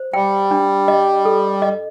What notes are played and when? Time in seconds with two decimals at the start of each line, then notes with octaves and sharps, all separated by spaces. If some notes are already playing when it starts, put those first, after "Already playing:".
Already playing: C5
0.14 G3 G5
0.51 D4
0.88 D#5
1.25 A4
1.62 D#5